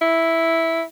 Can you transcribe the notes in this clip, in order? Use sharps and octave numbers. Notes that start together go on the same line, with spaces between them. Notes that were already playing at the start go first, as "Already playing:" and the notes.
E4